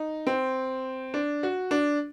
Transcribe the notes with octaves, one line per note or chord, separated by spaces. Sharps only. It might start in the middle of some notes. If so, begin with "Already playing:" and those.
Already playing: D#4
C4
D4
F#4
D4